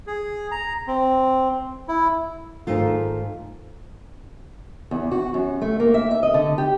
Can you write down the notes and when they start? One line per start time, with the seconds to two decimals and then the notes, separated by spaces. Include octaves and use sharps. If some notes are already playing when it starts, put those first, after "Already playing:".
0.07 G#4
0.51 A#5
0.87 C4
1.88 E4
2.67 G#2 D#3 A3 F4
4.91 E2
5.11 F#4
5.34 F#2
5.62 A3
5.80 A#3
5.94 E5
6.11 E5
6.23 D#5
6.34 D3
6.58 G4